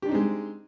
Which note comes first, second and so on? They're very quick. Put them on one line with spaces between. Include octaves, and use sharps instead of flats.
G4 D4 D#4 C4 G#3